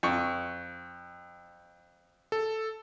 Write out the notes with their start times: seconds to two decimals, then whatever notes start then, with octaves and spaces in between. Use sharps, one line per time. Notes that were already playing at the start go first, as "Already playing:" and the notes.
0.03 F2 C#6
2.32 A4